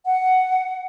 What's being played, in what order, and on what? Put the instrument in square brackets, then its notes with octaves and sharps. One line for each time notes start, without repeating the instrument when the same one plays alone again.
[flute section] F#5